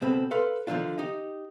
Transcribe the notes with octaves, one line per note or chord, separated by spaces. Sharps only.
C#2 B2 C4 A4 B5
A4 B4 F5 C6
D3 D#3 F3 C4 D4 F4
D#4 G4 D#5